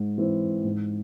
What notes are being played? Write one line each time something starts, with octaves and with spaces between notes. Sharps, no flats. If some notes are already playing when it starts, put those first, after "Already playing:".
Already playing: G#2
E3 C4
G#2